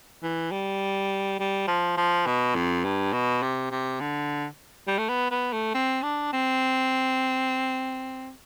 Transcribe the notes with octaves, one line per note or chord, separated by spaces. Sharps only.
E3
G3
G3
F3
F3
B2
F2
G2
B2
C3
C3
D3
G3
A3
B3
B3
A3
C4
D4
C4